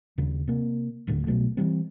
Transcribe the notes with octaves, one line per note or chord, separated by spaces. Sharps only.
D#2 C#3
C3 A#3
D#1 D2 A2 D3
C2 B2 F#3 A3
E3 F#3 G3 C4